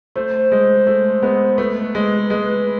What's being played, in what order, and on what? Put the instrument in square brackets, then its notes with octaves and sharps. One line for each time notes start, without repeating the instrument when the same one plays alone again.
[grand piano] A3 [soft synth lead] C5
[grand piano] G#3
A3
G#3 B3
[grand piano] A3 [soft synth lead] B4
[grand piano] G#3
G#3